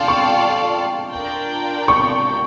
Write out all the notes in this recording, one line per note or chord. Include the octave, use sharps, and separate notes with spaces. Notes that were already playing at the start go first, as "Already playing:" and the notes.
Already playing: F4 A4 D5 F5 G5 A5
C#6
D4 F4 A#4 D5 G5
C#6